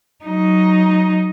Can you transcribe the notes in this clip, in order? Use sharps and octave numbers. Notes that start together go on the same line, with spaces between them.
F#3 D#4